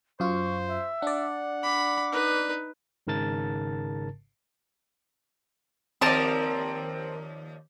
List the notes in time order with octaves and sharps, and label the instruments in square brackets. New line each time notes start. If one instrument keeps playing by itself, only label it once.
[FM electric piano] F#2 F4 [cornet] C5 [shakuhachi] C#6
[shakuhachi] E5
[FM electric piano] D4 D5 [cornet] F#5
[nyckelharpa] B5 [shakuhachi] D6
[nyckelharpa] D#4 B4
[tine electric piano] G#1 G#2 C#3 A#4 A5 A6
[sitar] D#2 F3 D5 [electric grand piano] C4 [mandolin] A#4 A5 D#6